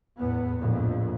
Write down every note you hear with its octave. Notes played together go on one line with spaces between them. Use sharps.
E2 A2 B3
A#1 F2 A2